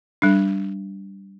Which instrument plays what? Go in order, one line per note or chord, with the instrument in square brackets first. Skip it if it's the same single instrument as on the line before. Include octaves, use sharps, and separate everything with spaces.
[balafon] G3 D4